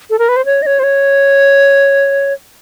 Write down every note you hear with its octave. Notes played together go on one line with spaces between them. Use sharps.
A4
A#4
B4
C5
C#5
D#5
C#5
C5
C#5